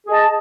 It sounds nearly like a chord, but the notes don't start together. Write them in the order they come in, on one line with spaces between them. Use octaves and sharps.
G#4 D#5 A5